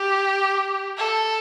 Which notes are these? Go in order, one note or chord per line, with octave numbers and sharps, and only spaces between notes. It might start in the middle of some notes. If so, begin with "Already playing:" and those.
Already playing: G4
A4